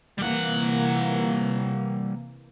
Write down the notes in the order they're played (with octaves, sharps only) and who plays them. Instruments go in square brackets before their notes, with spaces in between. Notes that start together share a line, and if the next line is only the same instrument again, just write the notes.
[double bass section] C3 E3 A#3 [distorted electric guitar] G3 F#5